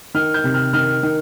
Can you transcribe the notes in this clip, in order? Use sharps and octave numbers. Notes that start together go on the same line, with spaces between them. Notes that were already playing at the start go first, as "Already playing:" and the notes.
D#3 F6
G6
C3
F6
D#3 F6
D#3